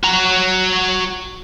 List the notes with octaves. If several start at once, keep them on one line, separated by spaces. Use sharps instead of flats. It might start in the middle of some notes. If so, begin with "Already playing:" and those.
F#4 A#5